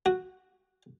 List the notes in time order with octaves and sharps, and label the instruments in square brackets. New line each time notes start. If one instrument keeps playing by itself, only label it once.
[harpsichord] F#4